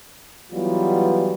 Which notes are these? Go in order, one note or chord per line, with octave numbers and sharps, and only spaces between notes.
E3 F#3 G3 B3 F4